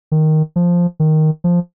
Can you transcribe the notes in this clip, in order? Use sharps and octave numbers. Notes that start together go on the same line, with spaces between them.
D#3
F3
D#3
F3